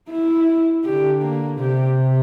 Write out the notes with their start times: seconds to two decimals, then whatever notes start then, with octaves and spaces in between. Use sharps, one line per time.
0.10 E4
0.85 D3 G4
1.23 A#3
1.59 C3 G4